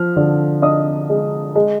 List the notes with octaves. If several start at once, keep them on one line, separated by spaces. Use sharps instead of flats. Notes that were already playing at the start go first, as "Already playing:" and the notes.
Already playing: F3 F6
D3
D4 D#5 D#6
G#3
G#3